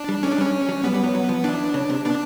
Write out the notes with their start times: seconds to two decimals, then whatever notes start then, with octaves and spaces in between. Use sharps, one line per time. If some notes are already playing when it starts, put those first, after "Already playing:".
Already playing: D4
0.09 G3
0.23 G#3 C#4
0.32 D4
0.38 G3
0.41 C#4
0.69 F#3
0.84 G3 B3
0.94 G3
1.03 F#3
1.15 F#3
1.29 F3
1.44 E3 D4
1.74 C#3
1.90 C3
2.05 B2 D4